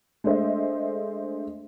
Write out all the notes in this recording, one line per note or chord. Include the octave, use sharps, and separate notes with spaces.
G#3 A3 D4 C5 D#5 E5